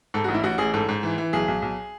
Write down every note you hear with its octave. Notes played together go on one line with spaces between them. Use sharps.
G#2 A4
F#4
A1
E4
A1 F#4
A1 G#4
G#2 A4
G#2
E3
E3
B1 G#4
B1
B1